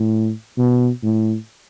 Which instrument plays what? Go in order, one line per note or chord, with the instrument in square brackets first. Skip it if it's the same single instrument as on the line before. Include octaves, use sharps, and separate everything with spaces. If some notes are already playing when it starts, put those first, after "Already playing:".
Already playing: [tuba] A2
B2
A2